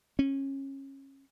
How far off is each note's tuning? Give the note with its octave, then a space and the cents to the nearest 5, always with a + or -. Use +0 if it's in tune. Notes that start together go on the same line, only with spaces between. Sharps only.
C#4 -25